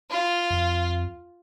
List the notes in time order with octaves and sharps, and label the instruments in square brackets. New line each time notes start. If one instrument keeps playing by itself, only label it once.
[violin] F4
[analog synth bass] F2